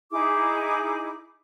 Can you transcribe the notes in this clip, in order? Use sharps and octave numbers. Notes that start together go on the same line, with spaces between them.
D#4 E4 G#4 D6